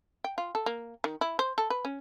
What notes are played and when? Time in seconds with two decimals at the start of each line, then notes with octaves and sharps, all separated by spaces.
0.24 G5
0.38 F4
0.55 A4
0.66 A#3
1.04 D#3
1.21 E4
1.39 C5
1.58 A4
1.70 B4
1.85 C#4